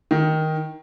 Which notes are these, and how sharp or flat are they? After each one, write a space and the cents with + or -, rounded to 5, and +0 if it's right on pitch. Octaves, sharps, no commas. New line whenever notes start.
D#3 +10